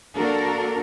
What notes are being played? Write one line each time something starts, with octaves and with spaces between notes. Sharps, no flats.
A#3 D4 F#4 A4 A#4